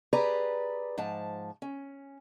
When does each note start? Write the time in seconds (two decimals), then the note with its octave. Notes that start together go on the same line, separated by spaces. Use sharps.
0.13 G4 G#4 B4 D5 A#5
0.98 G#2 F3 A5
1.62 C#4